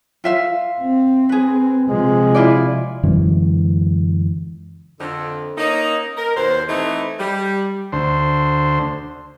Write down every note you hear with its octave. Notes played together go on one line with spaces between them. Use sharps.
F4 E5 F5
C4
G#4 B4
C3 F3 G#3
E4 F4 D5
F#2 D3 E3 G#3
F2 D3
A#3 C#4 D#4
A#4
D#2 B2 C5
E3 A3 C4 D#4
G3
D2 C5